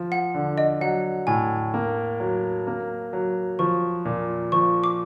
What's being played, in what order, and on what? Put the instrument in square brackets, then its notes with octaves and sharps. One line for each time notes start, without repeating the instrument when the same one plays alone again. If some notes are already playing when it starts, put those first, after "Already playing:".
Already playing: [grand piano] F3
[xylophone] F#5
[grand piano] D3
[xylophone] D#5
[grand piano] F#3 [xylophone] F#5
[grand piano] A2 [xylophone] G#5
[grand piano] A#3
F#3
A#3
F#3
[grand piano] F3 [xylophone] C#6
[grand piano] A#2
[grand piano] F3 [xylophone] C#6
[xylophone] D6